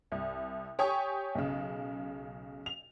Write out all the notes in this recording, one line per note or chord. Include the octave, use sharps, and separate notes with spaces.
C2
G4 C#5 G5 G#5 C#6 D#6
B1 C#3
F7